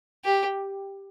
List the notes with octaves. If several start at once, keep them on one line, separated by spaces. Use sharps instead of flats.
G4